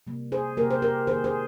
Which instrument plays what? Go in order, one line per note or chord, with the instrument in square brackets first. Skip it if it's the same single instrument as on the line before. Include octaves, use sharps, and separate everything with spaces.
[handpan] C3 G3 A#3
G#4 C5
C3 G3 A#3 G4 A#4
C5
G4 A#4
D#3 A#3 G#4 C5
G#4 C5